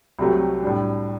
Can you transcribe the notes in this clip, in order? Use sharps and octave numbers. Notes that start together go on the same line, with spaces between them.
C2 C3 F#3 A3
A2 G3 D4